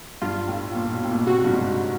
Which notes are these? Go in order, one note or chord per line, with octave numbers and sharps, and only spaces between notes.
G2 F4
A2
A#2
B2
A2
A#2
B2
C3 F#4
G2
G#2